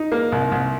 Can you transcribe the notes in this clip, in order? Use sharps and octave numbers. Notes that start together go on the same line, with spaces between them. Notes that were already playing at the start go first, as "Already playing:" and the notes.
Already playing: D#4
A#3
C2
C2